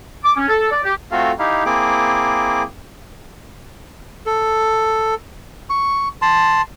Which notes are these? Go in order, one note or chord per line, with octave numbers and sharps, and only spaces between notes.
D6
C#4
A4
D5
G4
A3 C4 F4 F#4 A4 F5
D#4 E4 G4 F5
A#3 C4 E4 G#4 D6
A4
C#6
A5 C6